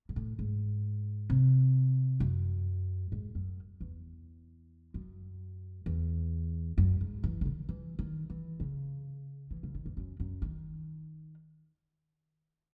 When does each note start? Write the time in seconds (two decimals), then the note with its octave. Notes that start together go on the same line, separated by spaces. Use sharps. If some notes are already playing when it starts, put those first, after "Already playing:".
0.09 G#2
0.16 A2
0.39 G#2
1.30 C3
2.20 F#2
3.12 G#2
3.35 F#2
3.81 E2
4.94 F#2
5.86 E2
6.78 F#2
7.01 G#2
7.24 E3
7.41 C#3
7.45 D#3
7.69 E3
7.99 D#3
8.30 E3
8.60 C#3
9.51 E3
9.63 C#3
9.75 D#3
9.86 E2
9.97 F#2
10.20 F#2
10.42 D#3